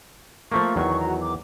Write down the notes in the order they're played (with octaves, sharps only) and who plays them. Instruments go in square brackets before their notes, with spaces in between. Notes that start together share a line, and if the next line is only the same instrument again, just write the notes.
[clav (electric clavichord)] F3 A3 A#3 [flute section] A4 C#6
[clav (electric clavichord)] E2 D#3 F#3 [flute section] C#6
[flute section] F#4 A#5
D6